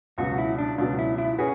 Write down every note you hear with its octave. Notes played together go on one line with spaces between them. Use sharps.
C#2 B2 F#3 F#4
E4
D4
C#2 B2 F#3 D4
E4
E4
C#4 F#4 G#4 B4